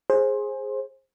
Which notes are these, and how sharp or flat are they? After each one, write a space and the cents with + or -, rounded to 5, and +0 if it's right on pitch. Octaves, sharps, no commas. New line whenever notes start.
G#4 +0 C5 +20